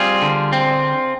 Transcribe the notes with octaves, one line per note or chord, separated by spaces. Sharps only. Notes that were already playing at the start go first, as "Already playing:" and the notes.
Already playing: G3 C4 F4 G#4
D3
C4